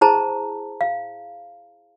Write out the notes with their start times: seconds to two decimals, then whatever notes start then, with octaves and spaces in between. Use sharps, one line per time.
0.01 E4 G#4 C5 A5 A#5
0.81 F5